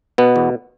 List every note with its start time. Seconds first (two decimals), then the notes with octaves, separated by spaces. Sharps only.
0.18 B2 B3
0.36 E2